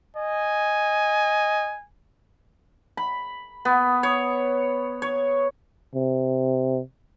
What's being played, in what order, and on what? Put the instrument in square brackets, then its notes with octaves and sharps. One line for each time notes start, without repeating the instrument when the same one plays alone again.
[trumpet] D#5 [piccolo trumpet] G#5
[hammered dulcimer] B5
B3
C#5
C#5
[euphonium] C3